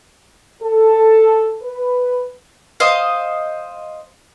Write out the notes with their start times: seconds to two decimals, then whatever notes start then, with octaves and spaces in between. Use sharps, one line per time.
0.63 A4
1.64 B4
2.80 C5 D#5 F5